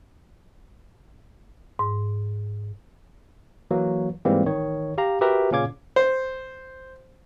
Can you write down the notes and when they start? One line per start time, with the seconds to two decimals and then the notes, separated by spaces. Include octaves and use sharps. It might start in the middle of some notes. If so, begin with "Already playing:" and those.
1.79 G#2
3.71 E3 F#3 A#3
4.25 G#2 E3 G3 G#3 A#3 C4
4.46 A1 D#3 C#5
4.98 G4 F5 A#5
5.21 F#4 G4 A#4 B4 E5 A#5
5.51 A#2 C#3 C#4 F5 D6 G#6
5.96 C5